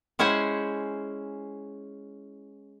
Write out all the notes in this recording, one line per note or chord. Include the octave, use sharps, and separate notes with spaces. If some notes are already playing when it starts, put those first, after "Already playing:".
G#3 C#4 E4 C5 F#5 G#5